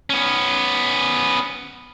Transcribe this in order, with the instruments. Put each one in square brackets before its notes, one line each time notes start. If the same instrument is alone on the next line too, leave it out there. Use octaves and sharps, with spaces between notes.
[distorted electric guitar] B3 C#4